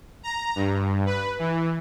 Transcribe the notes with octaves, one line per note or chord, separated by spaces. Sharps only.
A#5
G2
B4
E3